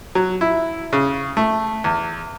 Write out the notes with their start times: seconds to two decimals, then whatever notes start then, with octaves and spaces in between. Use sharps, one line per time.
0.15 F#3
0.41 E4
0.93 C#3
1.37 A3
1.84 E2